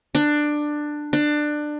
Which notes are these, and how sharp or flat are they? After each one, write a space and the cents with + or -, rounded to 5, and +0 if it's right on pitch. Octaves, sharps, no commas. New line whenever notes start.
D4 +15
D4 +20